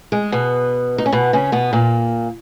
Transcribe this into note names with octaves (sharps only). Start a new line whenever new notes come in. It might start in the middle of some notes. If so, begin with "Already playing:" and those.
G#3
B2 B3
D#4
C#4
B2 B3
C#3 C#4
B2 B3
A#2 A#3